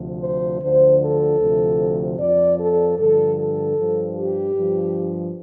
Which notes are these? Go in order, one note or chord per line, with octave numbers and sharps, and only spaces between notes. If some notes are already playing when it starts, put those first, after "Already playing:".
Already playing: D2 C3 F3
C5
D2 D3 F3 C5
A4
D2 C3 F3
F2 F3 D5
A4
G2 D3 F3 A4
A4
G2 F3
G4
G2 F3